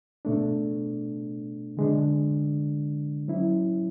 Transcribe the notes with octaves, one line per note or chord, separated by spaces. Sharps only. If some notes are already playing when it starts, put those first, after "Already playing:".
B2 A3 D4
D3 G#3 D4
F#3 C#4 E4